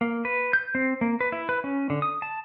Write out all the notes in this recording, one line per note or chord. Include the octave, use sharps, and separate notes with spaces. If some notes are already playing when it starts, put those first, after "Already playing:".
A#3
B4
G6
C4
A#3
B4
E4
B4
C#4
D3
D#6
A5